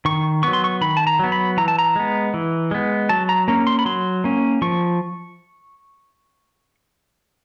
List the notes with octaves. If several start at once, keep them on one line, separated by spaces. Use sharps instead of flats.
D#3 C#6
F#3 B3 C#6
C6
C#6
D#3 B5
A5
A#5
F#3 B3
B5
E3 A#5
A5
A#5
G#3 B3
E3
G#3 B3
F#3 A5
A#5
A#3 C#4 A#5
C6
B5
F#3 C6
A#3 C#4
F3 C#6